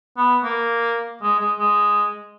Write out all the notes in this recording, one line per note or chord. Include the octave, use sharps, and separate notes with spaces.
B3
A#3
G#3
G#3
G#3